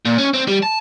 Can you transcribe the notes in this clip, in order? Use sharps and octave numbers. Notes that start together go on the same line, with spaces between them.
A#2
C#4
C4
G3
A5